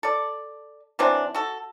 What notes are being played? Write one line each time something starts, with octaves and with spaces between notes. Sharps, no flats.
A4 D5
E3 F#3 C4 D4
F#4 A4